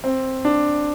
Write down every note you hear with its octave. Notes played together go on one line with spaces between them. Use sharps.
C4
D4